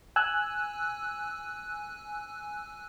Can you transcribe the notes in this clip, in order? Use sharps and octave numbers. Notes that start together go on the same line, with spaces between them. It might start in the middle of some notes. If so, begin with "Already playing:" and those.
G#5 E6 F#6